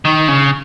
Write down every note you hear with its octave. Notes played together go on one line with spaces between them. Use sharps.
D#3
C#3